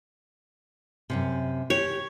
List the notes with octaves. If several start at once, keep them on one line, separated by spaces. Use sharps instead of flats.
F#2 A2 C3
G4 C#5